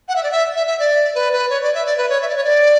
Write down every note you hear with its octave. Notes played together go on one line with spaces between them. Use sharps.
F#5
E5
D5
E5
E5
E5
D5
B4
B4
C#5
D5
E5
D5
B4
C#5
E5
D5
C#5
D5